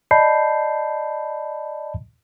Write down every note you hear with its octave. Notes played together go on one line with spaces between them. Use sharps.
D5 D#5 A5 B5 G6 C7